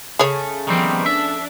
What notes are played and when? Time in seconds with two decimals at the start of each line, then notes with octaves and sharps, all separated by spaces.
0.19 C#3 A3 G#4 C#5
0.67 D#3 F3 G3 B3 C4
1.06 D4 E5